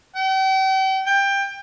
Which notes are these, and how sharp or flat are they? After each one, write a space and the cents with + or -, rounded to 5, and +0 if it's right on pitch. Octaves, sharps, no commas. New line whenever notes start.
G5 -40
G5 +20